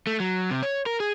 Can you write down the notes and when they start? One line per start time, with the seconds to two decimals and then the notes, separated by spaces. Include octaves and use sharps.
0.07 A3
0.20 F#3
0.51 C3
0.63 C#5
0.86 A#4
1.00 G#4